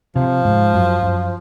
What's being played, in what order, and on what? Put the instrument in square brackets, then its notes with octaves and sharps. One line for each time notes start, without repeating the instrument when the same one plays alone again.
[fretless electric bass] C3 [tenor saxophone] F3
[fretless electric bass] G#2
F#2
F#2